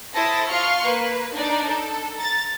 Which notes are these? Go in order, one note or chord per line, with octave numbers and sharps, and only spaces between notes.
E4 A4 C5 A5 D#6 A#6
F4 F5 C6 C#6 F6
A#3 B4
D4 D#4 D5
A4
A#5 A6